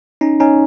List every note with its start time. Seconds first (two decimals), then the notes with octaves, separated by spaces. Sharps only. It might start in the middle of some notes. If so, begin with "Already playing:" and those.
0.21 C#4 D#4
0.40 C#4 D#4